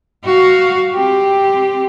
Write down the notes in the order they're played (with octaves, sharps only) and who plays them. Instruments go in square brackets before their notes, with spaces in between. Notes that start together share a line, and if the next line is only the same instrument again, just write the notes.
[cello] F#4 F5
C4 G4